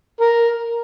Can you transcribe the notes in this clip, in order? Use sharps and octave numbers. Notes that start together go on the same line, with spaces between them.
A#4